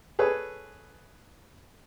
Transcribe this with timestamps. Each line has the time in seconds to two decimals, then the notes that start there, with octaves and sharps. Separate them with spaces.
0.19 G#4 A4 B4 C#5